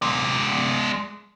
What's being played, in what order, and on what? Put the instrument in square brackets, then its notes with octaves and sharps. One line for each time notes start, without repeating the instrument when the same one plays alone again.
[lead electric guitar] G#3 D5